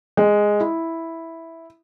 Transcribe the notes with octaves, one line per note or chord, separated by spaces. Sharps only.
G#3
E4